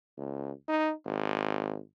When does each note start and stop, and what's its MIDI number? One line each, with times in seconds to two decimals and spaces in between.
0.17 0.51 37
0.68 0.91 63
1.05 1.79 32